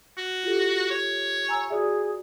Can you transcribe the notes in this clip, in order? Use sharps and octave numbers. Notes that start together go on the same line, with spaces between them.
F#4
F4 G4 A4
C#5
G#5 A#5 E6
F#4 G#4 D5 E5